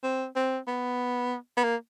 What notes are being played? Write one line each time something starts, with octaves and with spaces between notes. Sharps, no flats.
C4
C4
B3
B3
A#3